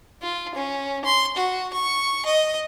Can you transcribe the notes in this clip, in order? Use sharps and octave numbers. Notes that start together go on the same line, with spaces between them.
F4
C#4
C6
F#4
C#6
D#5